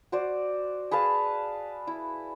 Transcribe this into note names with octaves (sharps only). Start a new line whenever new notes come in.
F#4 C5 D5
G#4 B4 F5 A5
E4